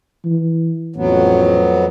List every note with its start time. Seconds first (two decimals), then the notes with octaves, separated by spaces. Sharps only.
0.25 E3
0.96 A1 F2 F#3 B3